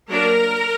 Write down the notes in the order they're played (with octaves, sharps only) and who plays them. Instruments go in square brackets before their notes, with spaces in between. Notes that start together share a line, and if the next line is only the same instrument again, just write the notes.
[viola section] F#3 A#3 D4 A#4